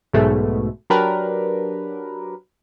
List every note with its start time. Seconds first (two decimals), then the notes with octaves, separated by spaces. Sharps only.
0.13 B1 G#2 B2 G#3 A3
0.90 F#3 D4 G4 A#4 B4